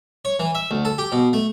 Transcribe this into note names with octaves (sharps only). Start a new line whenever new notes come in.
C#5
E3
E5
D2
A4
G4
B2
A3